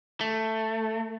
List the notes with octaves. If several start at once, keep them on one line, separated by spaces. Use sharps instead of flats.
A3